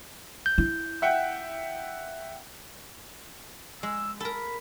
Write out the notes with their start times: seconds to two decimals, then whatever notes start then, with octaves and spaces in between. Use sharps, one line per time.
0.46 G6
0.58 E4
1.02 E5 F#5 G5
3.83 G#3 E6
4.20 A4 A#4 B5